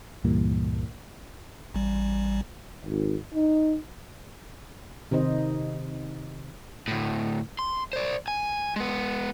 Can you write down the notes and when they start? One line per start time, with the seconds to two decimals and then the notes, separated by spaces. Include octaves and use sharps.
0.24 C#2 G2 A#2 E3 G3 A#3
1.74 A1 G3
2.85 G#1
3.34 D#4
5.11 C3 D#3 D#4 C5 D#5
6.88 D2 A2
7.59 C6
7.93 C5 D5
8.28 G#5
8.76 G#3 B3